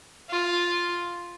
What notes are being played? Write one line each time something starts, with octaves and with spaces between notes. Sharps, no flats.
F4